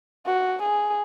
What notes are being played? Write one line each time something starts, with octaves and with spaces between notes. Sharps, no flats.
F#4
G#4